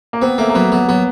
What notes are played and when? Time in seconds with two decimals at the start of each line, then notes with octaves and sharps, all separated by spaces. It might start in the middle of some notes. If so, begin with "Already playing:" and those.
0.13 A#3
0.22 B3 C4
0.38 A3 A#3
0.50 A#3
0.55 F#3 B3
0.72 F#3 B3
0.88 F#3 B3